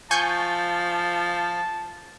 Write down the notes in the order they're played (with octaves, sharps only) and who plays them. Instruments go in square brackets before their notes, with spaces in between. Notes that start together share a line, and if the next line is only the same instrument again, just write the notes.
[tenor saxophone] F3 [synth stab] G#5 C#6 G6 [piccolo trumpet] A5